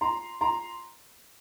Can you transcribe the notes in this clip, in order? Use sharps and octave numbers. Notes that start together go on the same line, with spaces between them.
A#5 C6
A#5 C6